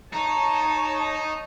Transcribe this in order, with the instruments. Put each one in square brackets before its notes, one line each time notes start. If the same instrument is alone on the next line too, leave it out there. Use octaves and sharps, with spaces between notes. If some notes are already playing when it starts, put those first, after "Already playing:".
[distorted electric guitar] D#4 [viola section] C#5 A5